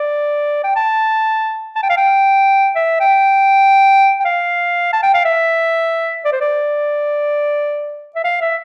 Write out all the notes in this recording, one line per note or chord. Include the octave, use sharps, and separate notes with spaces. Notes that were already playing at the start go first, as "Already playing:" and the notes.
Already playing: D5
G5
A5
A5
G5
F5
G5
E5
G5
G5
F5
A5
G5
F5
E5
D5
C5
D5
E5
F5
E5